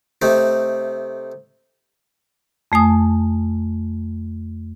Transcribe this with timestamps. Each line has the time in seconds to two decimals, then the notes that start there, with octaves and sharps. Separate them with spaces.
0.22 C3 A3 D#4
2.72 F2 A3 G#5 D#6